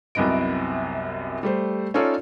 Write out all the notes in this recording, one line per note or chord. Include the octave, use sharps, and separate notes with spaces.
C2 F#2 C3 B3 D#5 D7
G3 A3 C5
C#4 D#4 F4 A4 C#5 D5